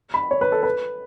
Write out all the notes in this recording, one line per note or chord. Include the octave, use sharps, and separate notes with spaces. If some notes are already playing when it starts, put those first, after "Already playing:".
B5
C#5
B4
A4
B4